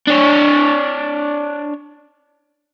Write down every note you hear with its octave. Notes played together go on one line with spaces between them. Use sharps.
D4 C#5